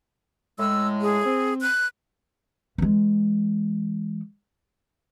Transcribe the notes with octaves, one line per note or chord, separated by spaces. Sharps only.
A2 G#3 E6
G#4
C4
F#6
E3 G#3